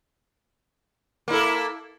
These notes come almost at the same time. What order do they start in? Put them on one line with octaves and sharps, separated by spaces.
A#3 E4 A4